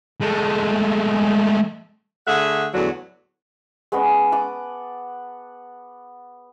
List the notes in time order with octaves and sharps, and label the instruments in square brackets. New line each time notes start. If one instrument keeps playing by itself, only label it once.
[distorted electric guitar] G#3 A3
[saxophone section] D3 A3 G#4 E5 F#5
E2 A2 D3 F#3
[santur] G#3 B3 C#4 D#5
F#5 A5 D6 D#6